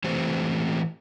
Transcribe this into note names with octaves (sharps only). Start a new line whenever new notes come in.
E3 A3 C4 G4 C5